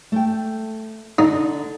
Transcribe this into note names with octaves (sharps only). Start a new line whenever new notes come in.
A3 G5
D3 D#4